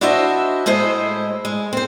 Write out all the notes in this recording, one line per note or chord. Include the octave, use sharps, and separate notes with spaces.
D4 E4 F#4 C5 D#5 E5
A2 G#3 E4 C5 D#5
G#3
C4 C5